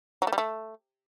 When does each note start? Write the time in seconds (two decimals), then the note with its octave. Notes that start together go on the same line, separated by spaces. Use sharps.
0.22 F#3
0.27 A3
0.32 G3
0.38 A3